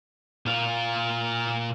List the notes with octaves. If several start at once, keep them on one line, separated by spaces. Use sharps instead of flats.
A#2 F4